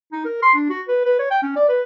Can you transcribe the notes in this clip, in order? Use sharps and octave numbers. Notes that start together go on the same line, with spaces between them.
D#4
A#4
C6
D4
F#4
B4
B4
C#5
G5
C#4
D5
B4